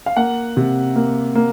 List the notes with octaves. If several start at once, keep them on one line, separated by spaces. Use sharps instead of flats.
F5
A#3 F#5
C3
A#3
A#3